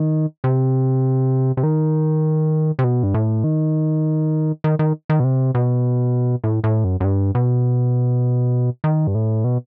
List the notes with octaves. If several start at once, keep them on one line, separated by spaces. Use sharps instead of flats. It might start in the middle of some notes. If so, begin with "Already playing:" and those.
Already playing: D#3
C3
C3
D#3
C3
B2
G2
A2
D#3
D#3
D#3
D#3
B2
C3
B2
A2
A2
F#2
F#2
G2
B2
D#3
G2
A2
B2